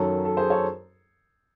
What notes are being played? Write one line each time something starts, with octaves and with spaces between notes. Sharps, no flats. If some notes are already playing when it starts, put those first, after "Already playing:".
Already playing: F#2 D#3 F#3 C#4 A4
A4
G#4 C5
A4 C#5